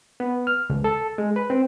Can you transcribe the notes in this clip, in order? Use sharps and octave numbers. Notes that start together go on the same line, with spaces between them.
B3
F6
C#2
A4
G#3
B4
C4